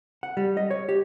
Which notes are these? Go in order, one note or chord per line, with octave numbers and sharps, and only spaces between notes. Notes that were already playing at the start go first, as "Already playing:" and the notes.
F#5
G3
D#5
C#5
G4